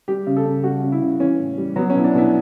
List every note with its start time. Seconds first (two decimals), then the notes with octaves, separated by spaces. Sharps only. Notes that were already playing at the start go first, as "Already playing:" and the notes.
0.08 G3 G4
0.27 C#3
0.36 A4
0.45 C#3
0.64 G3 F#4
0.83 C#3
0.92 E4
1.01 C#3
1.20 E3 C#4
1.39 A2
1.58 G3
1.76 F#3 B3
1.90 C#4
1.95 B2 E4
2.04 D4
2.14 B2 E4